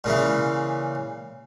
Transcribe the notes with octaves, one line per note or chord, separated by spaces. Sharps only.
A#2 C#3 E3